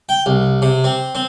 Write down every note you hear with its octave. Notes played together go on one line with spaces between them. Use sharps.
G5
C2
C3
C4
C4